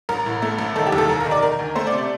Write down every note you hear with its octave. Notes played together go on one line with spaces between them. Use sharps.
A1 A#4
A2
A3
A1
D#3 A4
G4
D#2
A4
F1 A#4
A#4
D#3
D5
D#3 A#4
D2
A3 C5
D5
C3
D5